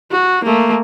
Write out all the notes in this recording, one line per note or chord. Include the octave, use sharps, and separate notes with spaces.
F#4
A3 A#3